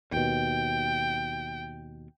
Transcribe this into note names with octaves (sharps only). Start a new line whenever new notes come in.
D#2 B2 G5